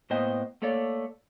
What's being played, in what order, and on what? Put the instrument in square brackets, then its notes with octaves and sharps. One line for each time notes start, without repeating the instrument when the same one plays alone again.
[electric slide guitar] A2 A#3 B3 C5 D#5 G5
A3 A#3 A4 C#5 D5